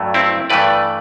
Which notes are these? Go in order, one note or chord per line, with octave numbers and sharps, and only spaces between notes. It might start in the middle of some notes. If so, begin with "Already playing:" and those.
Already playing: G2 F#3 A3
C4 E4
G2 E3 A3 B4 D5